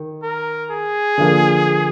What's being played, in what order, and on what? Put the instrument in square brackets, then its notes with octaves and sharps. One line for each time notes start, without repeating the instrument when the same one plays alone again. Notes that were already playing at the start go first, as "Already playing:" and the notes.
Already playing: [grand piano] D#3
[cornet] A#4
G#4
[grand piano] D3 F3 A#3